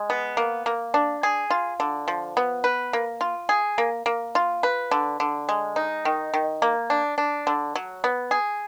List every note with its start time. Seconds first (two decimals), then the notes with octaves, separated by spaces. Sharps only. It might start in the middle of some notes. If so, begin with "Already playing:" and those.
Already playing: G#3
0.10 B3
0.37 A#3
0.66 A#3
0.94 D4
1.23 G#4
1.50 F4
1.80 D3
2.08 F3
2.37 B3
2.64 B4
2.93 A#3
3.21 F4
3.49 G#4
3.78 A#3
4.06 A#3
4.35 F4
4.63 B4
4.91 D3
5.20 D3
5.49 G#3
5.76 D#4
6.05 D#3
6.34 D#3
6.62 A#3
6.90 D4
7.18 D4
7.47 D3
7.75 F#3
8.04 B3
8.31 G#4